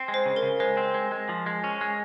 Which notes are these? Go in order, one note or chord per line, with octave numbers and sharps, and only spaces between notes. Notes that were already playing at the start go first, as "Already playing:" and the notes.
Already playing: C4
G#3
C5
C#3
A#4
C#3
G#3 C5
C4
G#3
G#3
F3
G#3
C#4
G#3